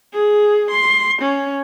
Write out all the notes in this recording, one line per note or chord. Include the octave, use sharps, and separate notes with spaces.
G#4
C6
C#4